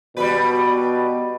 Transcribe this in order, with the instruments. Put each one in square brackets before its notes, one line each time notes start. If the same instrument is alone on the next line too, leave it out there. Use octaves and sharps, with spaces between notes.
[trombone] B2 [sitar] G3 B4